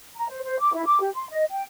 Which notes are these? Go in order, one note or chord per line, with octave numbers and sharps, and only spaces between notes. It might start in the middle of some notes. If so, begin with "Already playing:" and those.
A#5
C5
C5
D6
E4
D6
G4
C6
D#5
G5